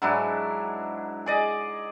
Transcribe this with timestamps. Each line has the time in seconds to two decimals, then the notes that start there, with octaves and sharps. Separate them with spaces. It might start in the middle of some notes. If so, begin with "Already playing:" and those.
0.02 G#2 F#3 D4 E4
1.26 G#4 D5 D#5